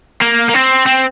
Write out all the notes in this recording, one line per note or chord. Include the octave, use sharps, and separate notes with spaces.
A#3
A#3
C4
C4